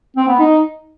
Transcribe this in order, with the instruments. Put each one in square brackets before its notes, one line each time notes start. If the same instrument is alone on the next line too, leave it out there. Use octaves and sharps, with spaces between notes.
[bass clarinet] C4
B3
D#4